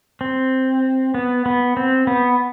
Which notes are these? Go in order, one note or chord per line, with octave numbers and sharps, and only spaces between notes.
C4
B3
B3
C4
B3